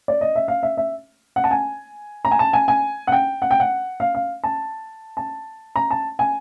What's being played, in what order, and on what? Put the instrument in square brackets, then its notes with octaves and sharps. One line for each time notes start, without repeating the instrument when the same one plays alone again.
[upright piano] D5
D#5
E5
F5
E5
E5
F#5
A5
G#5
A#5
G#5
A5
G#5
G#5
F#5
G5
F#5
G5
F#5
F5
F5
A5
A5
A#5
A5
G#5